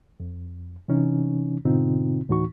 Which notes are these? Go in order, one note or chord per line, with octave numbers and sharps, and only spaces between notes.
F2
C3 E3 C#4 D#4
G#2 B2 D3 C4 D#4 F4
D2 A2 E3 D#4 F#4 C#6